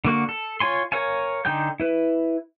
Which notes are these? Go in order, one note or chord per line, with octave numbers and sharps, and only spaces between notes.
D3 A#3 F#4
A4
F4 C#5 G#5 C6
A#4 C#5 F5 G#5
D3 D#4 G5 G#5 G6
E4 B4